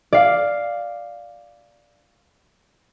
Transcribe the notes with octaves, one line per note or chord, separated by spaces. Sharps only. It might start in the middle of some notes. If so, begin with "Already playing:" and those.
D5 F5